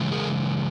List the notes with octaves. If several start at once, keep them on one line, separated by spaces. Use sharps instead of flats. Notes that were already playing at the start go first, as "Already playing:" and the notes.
Already playing: C#3 E3 G#3
G#4 A#4